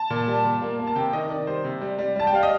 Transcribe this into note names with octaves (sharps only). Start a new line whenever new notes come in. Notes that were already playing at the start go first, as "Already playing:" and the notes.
Already playing: A5
A#2
G3
A#2
A#3
A#3
A5
C3 G5
D#3 D#5
D#3 D5
G3 C5
C3
G3
G3
G3 A5
G5
G3 F5
D#5